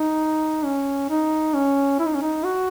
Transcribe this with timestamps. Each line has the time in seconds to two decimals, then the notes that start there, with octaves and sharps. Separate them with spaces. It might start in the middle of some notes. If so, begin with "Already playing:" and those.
Already playing: D#4
0.64 C#4
1.10 D#4
1.54 C#4
1.99 E4
2.06 D#4
2.14 C#4
2.22 D#4
2.44 F#4